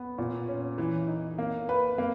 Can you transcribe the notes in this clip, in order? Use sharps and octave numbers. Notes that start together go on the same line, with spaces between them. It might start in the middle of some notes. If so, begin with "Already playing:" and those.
Already playing: B3
A#2
C#4
E3
D#4
A#3
B4
A#3